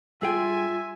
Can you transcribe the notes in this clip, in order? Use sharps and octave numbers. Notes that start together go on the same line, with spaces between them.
G2 F4 G#4 E5 G5 G#5